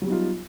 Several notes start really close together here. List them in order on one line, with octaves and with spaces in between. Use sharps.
F#3 G3 B3 D#4 F4